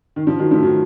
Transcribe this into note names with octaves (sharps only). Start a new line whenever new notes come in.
D#3
F3
D#3 F#3
F3 A3
D#3 F#3